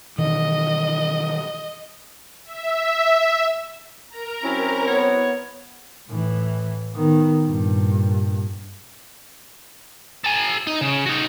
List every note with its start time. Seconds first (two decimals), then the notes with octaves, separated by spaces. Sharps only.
0.18 B2 D#3 E3 D#5
2.46 E5
4.09 A#4 A#5
4.44 F#3 C4 C#4 E4
4.87 B3 C#5
6.10 A2 E3
6.94 D#3 B3
7.45 G2 A#2
10.24 A4 G#5
10.67 D#4
10.81 C#3
11.06 D#4 F#4